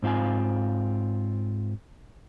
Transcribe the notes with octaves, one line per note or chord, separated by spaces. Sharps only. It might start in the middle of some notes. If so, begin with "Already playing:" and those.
G#2 C4 F4 F5 G#5